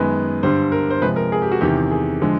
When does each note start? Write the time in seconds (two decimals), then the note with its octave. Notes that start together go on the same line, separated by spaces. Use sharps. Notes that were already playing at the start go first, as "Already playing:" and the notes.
Already playing: F#2 D#3 G#3 B3 B4
0.43 G2 D3 G3 C5
0.72 A#4
0.90 C5
1.01 C3 F3 G#3 B4
1.16 A#4
1.32 G#4
1.42 G4
1.52 F#4
1.61 E2 C3 D#3 G4
1.91 G#4
2.22 D3 F3 G#3